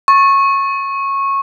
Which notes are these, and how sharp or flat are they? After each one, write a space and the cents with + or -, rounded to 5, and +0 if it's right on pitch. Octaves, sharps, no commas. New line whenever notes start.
C#6 -15